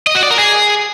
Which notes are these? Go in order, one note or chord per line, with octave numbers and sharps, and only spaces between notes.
D#5
F#4
D5
A#4
G#4